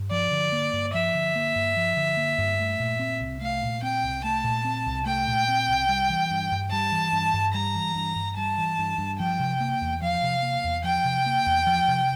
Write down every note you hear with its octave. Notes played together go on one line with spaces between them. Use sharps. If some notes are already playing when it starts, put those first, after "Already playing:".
Already playing: G2
F3 D5
D3
A#3
G2
F3 E5
D3
A#3
G2
F3
D3
A#3
G2
A3
A#2
C4
C2
A3 F5
A#2
C4 G5
C2
A3 A5
A#2
C4
C2
A3 G5
A#2
C4
C2
G3
E3
G2
G2
G3 A5
E3
G2
G2
G3 A#5
E3
G2
G2
G3 A5
E3
G2
G2
F3 G5
C3
A#3
E2
F3 F5
C3
A#3
E2
F3 G5
C3
A#3
E2
F3
C3